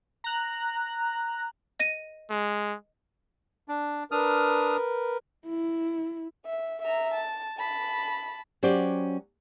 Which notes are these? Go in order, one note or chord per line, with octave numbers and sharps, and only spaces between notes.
A#5 F#6
D#5 A#6 D#7
G#3
D4
D4 A#4 B4 D#6 F6
E4
E5
E5 A#5
A5
A5 B5
F#3 C#4 G4 C5 D5